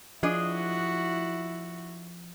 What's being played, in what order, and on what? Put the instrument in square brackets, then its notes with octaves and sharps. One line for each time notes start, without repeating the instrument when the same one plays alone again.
[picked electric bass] F3 [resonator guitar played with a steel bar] D4 G#4 D#5 [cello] E4 F#4